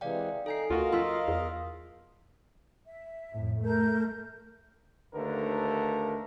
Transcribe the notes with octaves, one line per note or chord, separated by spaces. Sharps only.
C3 E3 G#3 D5 F5 G5
D#4 A4 A#4 G#5 C7
D2 F4 F#4 A#4 D#5 F5
F3 C6 E6 B6
E2
E5
F2 A2
A3 A#4 G6
D#2 D3 A3 A#4 B4